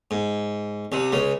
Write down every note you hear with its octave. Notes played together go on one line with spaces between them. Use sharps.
G#2
C2 C3
C#2 C#3